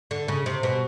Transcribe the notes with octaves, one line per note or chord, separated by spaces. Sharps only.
D3
C#3
C3
B2